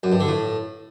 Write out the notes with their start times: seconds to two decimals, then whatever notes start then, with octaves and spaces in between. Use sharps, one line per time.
0.03 F#2
0.12 G2
0.20 D3
0.28 A2